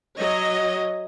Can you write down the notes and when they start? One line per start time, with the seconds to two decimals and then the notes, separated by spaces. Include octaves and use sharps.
0.19 F#3 C#5 D#5